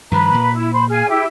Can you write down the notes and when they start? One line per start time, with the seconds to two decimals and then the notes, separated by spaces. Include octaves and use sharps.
0.11 G2 D#3 F3 B4 A#5 B5
0.34 A#2
0.53 E4
0.73 C5 B5
0.89 G#4 F5 G#5 F6
1.09 E4 G4 E5